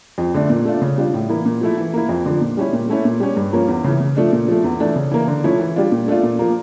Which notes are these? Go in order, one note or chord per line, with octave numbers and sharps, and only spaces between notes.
F2
D3 A3 D4
A#2
A3 D4 F4
C#3
G3 D4 F4
A2
E3 A#3 E4
A#2
F3 A3 E4
E3
A#3 E4
F2
D3 F3
A#2
G3 C#4 E4
A#2
A3 C#4 E4
A#2
G3 C#4
G2
F3 A#3 C#4
E2
C#3 E3
C#3
F3 A3 D4
A#2
F3 A3
E2
E3 A3 D4
C#3
E3 A#3
D3
F3 A3 C#4 E4
E3
G3 D4 F4
A#2
A3 D4 F4
A#2
F3 A#3